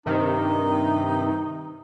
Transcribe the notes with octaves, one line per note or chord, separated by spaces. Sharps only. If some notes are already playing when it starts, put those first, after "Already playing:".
G2 C3 D#3 D#4